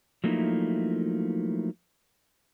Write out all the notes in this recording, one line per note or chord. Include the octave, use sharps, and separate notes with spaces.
F3 F#3 A3 A#3 D#4 E4